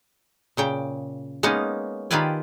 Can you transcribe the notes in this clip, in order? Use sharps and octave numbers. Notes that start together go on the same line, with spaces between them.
A#2 C#3 G5
G#3 A#3 B3 C#4 D#4
D#3 F4 G4 B4 D5 G#5